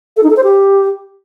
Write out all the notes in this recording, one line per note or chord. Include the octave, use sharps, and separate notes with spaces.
A4
D#4
A4
C5
G4